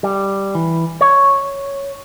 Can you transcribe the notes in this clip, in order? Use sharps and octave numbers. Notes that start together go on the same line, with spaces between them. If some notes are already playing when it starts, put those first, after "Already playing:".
G3
E3
C#5